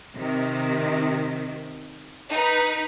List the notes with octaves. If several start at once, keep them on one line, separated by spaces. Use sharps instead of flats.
C3 D#3
D#4 B4